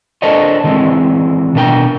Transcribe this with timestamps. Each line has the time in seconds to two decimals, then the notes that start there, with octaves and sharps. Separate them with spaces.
0.22 D4 A4 A#4 C5 C#5 D#5
0.64 D#3 E3 G#3 C4
1.55 B2 D4 A#4 G5